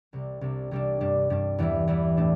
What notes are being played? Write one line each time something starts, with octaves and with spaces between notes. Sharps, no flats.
C2 C3 G3
C2 C3 G3 D4
C2 C3 G3 D4
G2 G3 D4
G2 G3 D4
E2 E3 G3 E4
E2 E3 G3 E4
A2 A3 D4